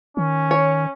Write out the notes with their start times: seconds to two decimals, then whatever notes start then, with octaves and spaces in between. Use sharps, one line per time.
0.17 D#3 C#4
0.51 C#5